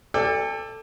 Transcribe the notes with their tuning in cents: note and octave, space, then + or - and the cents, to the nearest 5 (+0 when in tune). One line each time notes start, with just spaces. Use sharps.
A4 +5 D5 +0 G5 +45